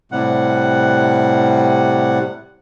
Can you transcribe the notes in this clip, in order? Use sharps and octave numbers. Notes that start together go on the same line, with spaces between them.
A2 C3 G3 F#5